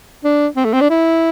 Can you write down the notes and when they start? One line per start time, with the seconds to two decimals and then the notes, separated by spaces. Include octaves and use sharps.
0.24 D4
0.56 C4
0.65 A3
0.73 C4
0.81 D4
0.90 E4